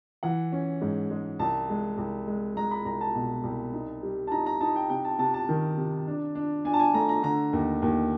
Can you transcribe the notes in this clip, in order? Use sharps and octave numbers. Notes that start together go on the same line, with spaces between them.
E3 F#5
C#4
G#2
G#3
C2 A5
G#3
C2
G#3
G#3 A#5
B5
C2 A#5
A5
B2
C2
D#4
G3
A5
D#4 A#5
A#5
D#4 A5
G5
C3 G5
A5
C3 A5
A5
D#3
C3
D4
D4
D4 G#5
A5
G#5
A3 A#5
A#5
D3 A#5
D#2
D#2